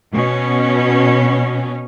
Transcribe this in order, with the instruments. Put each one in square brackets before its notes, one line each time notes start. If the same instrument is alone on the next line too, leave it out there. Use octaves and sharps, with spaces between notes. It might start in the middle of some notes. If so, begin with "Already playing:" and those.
[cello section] B2 C#4